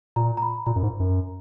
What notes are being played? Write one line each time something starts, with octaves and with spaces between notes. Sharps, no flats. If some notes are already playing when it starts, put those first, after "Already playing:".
A#2 A#5
A#5
B5
A#2 A#5
F#2
G#2
F#2